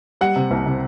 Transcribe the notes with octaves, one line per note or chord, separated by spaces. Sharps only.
G3 F#5
C3
C2
C3